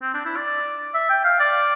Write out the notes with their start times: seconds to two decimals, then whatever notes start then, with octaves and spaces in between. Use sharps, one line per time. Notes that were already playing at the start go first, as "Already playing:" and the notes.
0.02 C4
0.14 D4
0.25 E4
0.37 D5
0.94 E5
1.10 G5
1.24 F5
1.40 D5